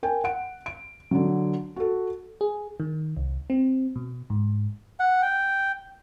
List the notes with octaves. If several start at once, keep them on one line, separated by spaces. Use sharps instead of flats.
A#4 G5 G#5
F#5 D7
D7
D3 F#3
F#4 A4
G#4
D#3
C2
C4
B2
G#2
F#5
G5